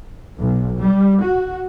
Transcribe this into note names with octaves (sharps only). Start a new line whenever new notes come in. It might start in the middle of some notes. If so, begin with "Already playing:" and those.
B1
G3
F#4